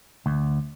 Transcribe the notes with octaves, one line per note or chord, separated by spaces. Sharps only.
D2